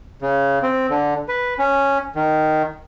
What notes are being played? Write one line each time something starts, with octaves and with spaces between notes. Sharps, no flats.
C#3
C4
D3
B4
C#4
D#3